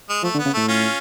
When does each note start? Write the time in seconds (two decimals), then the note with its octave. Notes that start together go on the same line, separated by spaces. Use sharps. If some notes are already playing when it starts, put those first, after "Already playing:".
0.09 G#3
0.23 F3 A3
0.34 D3
0.38 B3
0.45 C#3
0.53 A2 A3
0.68 C#4 F4